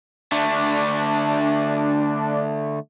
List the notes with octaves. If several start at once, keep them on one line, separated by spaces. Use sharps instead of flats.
D3 A3 D4